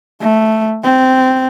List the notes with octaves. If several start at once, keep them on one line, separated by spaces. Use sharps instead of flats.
A3
C4